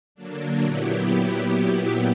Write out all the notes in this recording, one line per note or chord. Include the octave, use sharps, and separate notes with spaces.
D3 F#3 A#3 D4
A#2 F#3 B3 E4 G4